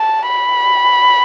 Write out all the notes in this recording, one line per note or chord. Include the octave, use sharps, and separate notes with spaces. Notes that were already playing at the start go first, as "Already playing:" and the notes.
Already playing: A5
B5